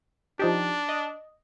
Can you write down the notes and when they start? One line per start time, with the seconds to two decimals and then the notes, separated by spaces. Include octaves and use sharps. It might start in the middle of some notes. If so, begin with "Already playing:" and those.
0.39 F3 D4 D#4 G4
0.89 D#5